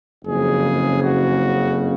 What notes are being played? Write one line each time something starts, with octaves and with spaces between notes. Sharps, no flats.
F#1 F2 C#3 F3 G#4
F#4